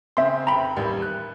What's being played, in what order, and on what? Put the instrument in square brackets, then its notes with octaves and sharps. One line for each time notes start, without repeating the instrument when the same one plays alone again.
[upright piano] C#3 C4 [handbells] E5 C6
[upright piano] F1 G5 [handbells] A#5 B5
[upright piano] A1 D#2 G3
F#6